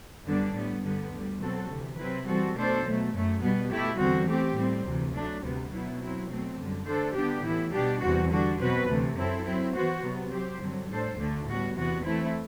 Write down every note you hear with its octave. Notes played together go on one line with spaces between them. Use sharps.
F#2 D3 G3 B3 D4
A2 G3 B3
G2 D3 G3 B3
D2 D3 G3
B2 F#3 C4 F#4 A4
D2 C3 E3
C3 F#3 C4 E4 B4
E3 G3 C4 F#4 A4
B2 A3 D4 A4 C5
B2 F#3 A3
F#2 F#3 A3
B2 G3 B3
B2 A3 E4 G4
E2 D3 G3 C4 F#4
E3 A3 C4 G4
A2 G3 C4
D2 C3 E3
F#3 A3 D4
D2 C3 G3 B3
B2 F#3 B3 E4
F#3 C4 E4
B2 F#3 A3 C4
F#2 D3 G3
D3 A3 D4 A4 C5
D3 G3 B3 D4 G4
A2 E3 B3 E4
B2 G3 B3 D4 G4
E2 C3 G3 C4 F#4
D3 G3 D4 F#4
B2 F#3 C4 F#4 B4
D2 C3 E3 A3
F#2 F#3 C4 E4 A4
F#3 C4 E4
E3 B3 F#4 C5
C3 F#3 B3
F#3 C4 G4 C5
G2 D3 F#3 C4
A2 G3 D4 A4 C5
D2 D3 A3 D4
A2 G3 B3 F#4
E2 C3 E3 B3 F#4
E3 A3 C4 E4